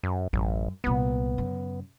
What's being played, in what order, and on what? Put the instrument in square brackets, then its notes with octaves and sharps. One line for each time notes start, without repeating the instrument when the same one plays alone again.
[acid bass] F#2
[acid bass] A1 [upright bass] F#2
[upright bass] C2 A#2 [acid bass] B3
[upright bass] F#2 C#3